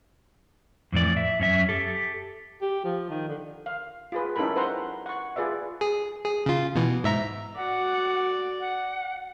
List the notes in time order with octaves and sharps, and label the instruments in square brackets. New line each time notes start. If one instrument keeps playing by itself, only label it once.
[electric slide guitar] F2 A2 E3 D5
E5
F#2 C#4 E5
G4 A4
[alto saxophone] G4
F3
D#3
D3
[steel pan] F5
F4 G#4 B4
C#4 D#4 E4 A4 A#4 B5
B4 C5 F#5 A#5 C6
F#5 C#6
F4 G#4 B4 D5 E5
[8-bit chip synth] G#4
G#4
C#3 F4
B2 E3
G#2 E5 A#5
[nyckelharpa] F#4 D5 [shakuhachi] F#5
[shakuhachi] F#5